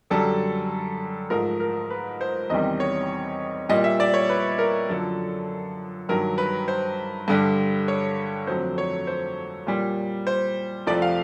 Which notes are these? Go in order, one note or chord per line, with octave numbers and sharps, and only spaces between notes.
F#2 D3 G3 A4
G#2 F3 A3 A#4
A#4
B4
C5
E2 C3 D#3 G3 D#5
C#5
A#2 G3 D#5
E5
D5
C#5
B4
A#4
F#2 D3 F3 A4
G2 D#3 F#3 A#4
B4
C5
G2 D3 G3
C#5
F2 D3 F#3 A3 C5
C#5
C5
A#2 G3
C5
F2 C3 F3 A3 D5
F5